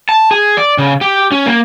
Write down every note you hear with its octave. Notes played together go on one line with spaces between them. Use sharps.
A5
G#4
D5
C#3
G4
C#4
A#3